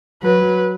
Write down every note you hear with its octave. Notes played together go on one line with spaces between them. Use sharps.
F#3 B4